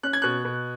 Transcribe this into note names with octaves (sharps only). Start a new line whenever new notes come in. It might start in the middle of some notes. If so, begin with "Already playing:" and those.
C#4 F#6
G#6
B2 F#6
B2